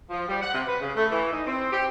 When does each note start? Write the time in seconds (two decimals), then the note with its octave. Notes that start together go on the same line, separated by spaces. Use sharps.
0.10 F3
0.28 G3
0.41 F#5
0.54 C3
0.67 B4
0.80 C#3
0.96 A3
1.11 E3
1.33 D#4
1.46 C4
1.72 G4